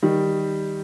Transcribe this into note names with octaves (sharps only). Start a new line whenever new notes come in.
D#3 G3